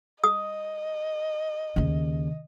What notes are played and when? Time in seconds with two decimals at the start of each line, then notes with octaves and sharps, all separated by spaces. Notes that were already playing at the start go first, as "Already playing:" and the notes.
0.24 D#5 D#6
1.76 D#2 C#3